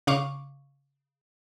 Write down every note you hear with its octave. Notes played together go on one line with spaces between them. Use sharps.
C#3 F5 C#6 D6